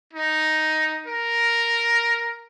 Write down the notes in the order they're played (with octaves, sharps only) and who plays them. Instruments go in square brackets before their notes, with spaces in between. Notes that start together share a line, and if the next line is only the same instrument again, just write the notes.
[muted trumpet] D#4
A#4